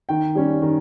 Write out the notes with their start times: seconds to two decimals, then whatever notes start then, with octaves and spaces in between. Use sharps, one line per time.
0.09 D#3 G5
0.35 G3 C#4
0.62 D#3